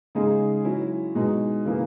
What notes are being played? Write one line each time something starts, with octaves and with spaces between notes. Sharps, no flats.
C#3 G#3 D#4 G#4
F#3 C#4 E4
B2 G#3 D#4
C#3 E3 A#3 E4